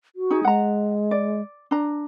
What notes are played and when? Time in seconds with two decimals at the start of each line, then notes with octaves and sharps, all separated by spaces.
0.16 F#4
0.31 D#4 G#4
0.45 G#3 F#5 A#5
1.11 D5
1.71 D4 A#5